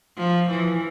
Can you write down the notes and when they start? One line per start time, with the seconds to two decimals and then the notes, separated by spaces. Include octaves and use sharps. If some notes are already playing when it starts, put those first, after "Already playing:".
0.17 F3
0.50 E3